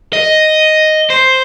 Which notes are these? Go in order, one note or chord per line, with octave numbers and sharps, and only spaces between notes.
D#5
C5